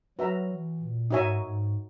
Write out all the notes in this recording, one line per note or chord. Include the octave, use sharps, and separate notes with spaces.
F#3 F#4 B4 E5 A#5
E3
A#2
G#2 D#4 F#4 C#5 E5 G#5
G#2